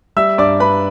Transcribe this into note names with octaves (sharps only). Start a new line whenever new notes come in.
G3 E5 E6
G2 D5 D6
D4 B4 B5